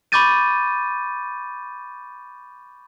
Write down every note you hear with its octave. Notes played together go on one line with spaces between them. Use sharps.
B5 C#6 D6 G6 A6 D#7